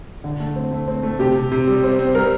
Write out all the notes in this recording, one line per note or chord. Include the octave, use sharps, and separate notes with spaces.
D3
A3
C4
A3
C4
A3
C3 G4
C3
C3
G3
C4
C4
G3 A#4